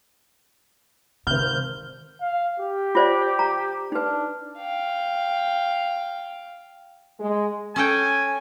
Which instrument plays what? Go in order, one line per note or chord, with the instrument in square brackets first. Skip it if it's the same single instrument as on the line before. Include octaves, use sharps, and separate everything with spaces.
[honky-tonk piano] G#1 F6 [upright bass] C3 [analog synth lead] G6
[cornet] F5
G4
[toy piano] F4 C5 D5
A#5
[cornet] D4 [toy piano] D#4 B4
[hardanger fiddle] F5 G5
[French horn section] G#3
[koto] C#4 A4 G5 [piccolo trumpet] G#5